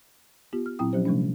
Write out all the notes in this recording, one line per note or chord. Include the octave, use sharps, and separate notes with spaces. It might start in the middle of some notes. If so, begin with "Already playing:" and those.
B3 F4 G4
F6
A#2 F#3 C4 E4 G5 D#6
F3 F#3 C#4 G4 C5
C3 F3 G3 A3 C#4 D4